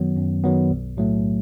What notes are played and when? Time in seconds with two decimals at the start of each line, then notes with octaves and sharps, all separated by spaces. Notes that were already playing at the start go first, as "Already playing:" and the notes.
Already playing: F#2 D#3 F#3 B3
0.16 F#2
0.44 D#3 F#3 B3
0.70 B1
0.97 A2 F#3 A3